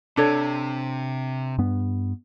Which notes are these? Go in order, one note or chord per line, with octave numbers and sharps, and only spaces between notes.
C3 D4 A4 C#5
G2 B3